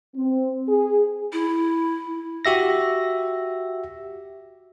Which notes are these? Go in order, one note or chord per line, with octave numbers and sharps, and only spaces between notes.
C4
G#4
E4
F#4 G4 E5 A#6